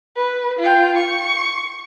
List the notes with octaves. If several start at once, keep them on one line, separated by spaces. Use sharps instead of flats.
B4
F4 G5
C#6